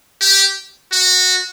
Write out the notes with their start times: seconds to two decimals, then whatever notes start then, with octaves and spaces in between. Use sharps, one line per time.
0.21 G4
0.92 F#4